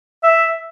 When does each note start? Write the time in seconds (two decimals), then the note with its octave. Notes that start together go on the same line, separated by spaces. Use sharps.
0.23 E5